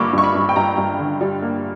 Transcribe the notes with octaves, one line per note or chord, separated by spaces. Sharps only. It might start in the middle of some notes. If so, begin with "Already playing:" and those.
Already playing: G2 D3 A#3 B5 C#6 D6
G2 C#6
B5
G2
G5
G2 A#5
G2
D3
G3
A#3